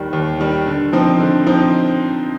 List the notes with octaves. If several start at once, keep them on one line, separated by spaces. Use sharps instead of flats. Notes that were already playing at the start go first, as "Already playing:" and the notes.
Already playing: D#2 D#3 G3
D#2
D#3 G3
D3
F3 C4 D#4
D3
F3 C4 D#4